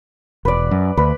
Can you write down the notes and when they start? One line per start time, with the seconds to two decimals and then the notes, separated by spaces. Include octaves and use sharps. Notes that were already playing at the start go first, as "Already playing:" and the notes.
0.45 E1 B4 D5
0.71 F#2
0.97 D2 B4